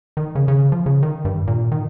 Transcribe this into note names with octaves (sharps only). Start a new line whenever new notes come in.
D#3
C#3
C#3
F3
C#3
D#3
G2
A#2
D#3